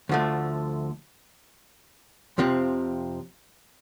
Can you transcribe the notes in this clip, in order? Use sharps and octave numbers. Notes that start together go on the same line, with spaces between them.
D2 D3 F3 A3
F2 C3 F3 C4